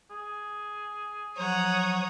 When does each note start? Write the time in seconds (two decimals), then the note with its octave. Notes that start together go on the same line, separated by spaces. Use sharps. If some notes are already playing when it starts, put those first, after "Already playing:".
0.11 G#4
1.37 F3 F#3 C#5 F#5 A#5 D#6